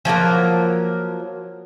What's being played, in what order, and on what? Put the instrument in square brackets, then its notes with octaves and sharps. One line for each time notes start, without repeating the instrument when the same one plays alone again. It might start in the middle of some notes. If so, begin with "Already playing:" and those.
[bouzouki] F3 F#3 A#3 A#4